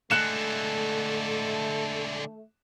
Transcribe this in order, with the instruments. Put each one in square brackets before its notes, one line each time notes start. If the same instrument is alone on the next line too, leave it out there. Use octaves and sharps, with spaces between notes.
[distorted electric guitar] D3 G#3 [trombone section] A3 [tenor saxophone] A4 [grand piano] F#6 C#7 E7